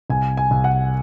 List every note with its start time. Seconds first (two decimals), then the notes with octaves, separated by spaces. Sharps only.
0.10 C2 G#5
0.37 G#5
0.51 C2
0.64 F#5